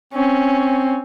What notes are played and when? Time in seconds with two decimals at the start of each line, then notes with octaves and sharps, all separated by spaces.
0.14 C4 C#4